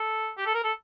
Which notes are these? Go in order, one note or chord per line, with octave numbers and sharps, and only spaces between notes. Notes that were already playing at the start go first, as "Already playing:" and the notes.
Already playing: A4
G4
A4
A#4
A4